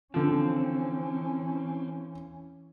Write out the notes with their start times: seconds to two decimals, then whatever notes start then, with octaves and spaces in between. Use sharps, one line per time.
0.14 D3 E3 F3 C4 C#4